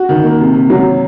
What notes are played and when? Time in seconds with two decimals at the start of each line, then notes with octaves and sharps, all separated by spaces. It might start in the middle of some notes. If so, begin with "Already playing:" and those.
Already playing: F#4
0.09 D#3
0.24 A#3
0.40 C3
0.55 C3
0.70 F#3